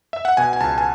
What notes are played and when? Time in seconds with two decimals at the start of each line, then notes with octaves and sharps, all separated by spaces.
0.13 E5
0.25 F#5
0.37 B2 G#5
0.53 G#5
0.60 C#2 A5
0.78 G#5